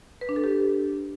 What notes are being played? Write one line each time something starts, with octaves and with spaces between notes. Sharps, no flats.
B4
D4
A4
G4